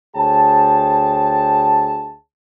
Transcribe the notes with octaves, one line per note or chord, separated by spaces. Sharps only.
D2 G#4 C#5 G5 A5